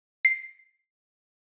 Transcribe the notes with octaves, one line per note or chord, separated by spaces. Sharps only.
C7